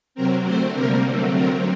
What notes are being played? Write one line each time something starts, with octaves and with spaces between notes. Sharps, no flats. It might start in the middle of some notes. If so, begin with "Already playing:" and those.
C3 F#3 C4 A#4
D3 A3 C4 C5
C3 G3 A#3 A#4
D3 F#3 A3 C4
D3 F#3 C4 A#4